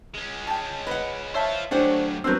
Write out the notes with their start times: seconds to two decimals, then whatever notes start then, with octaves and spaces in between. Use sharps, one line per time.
0.14 G#3 C#4
0.47 G5 A5
0.87 B4 D#5 F#5
1.34 C5 C#5 E5 F5 A5
1.71 F#3 A3 C#4 D4 G4 C5 F#5
2.24 F#3 B3 C4 D4 A#4 E6 G6